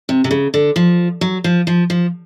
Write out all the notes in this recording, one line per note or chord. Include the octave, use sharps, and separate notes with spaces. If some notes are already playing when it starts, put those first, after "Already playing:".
C3
C3
C#3
D3
F3
F#3
F3
F3
F3